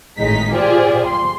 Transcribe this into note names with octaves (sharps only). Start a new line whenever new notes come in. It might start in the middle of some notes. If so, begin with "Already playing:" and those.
G#1 A2 G#3 D#4 B6
F4 G4 G#4 C5 D5
C6